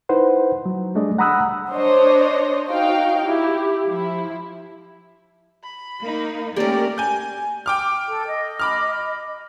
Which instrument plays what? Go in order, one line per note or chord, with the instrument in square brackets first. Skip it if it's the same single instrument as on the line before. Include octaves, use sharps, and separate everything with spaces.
[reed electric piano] D#4 E4 B4 C5 F#5
F#3
G3 A3 D4 G#4 D5 D#5
F#5 A#5 B5 D#6 E6 F#6
[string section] D4 C5 C#5 D#5
D#4 F#4 F5 G5
E4 G4
F3 E4
[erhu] B5
[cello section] A#3 D#4
[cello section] A3 A#4 [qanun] A#3 C#4 [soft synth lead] G4 [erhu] D5
[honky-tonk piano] G#5 G6
G5 D6 F6
[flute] A4
D#5
[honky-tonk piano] B5 D6 F6